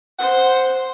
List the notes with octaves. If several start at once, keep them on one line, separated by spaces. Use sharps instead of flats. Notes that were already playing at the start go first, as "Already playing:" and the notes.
C5 F#5